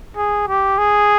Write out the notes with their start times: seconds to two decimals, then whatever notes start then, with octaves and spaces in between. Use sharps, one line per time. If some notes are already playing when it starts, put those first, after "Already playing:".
0.16 G#4
0.48 G4
0.78 G#4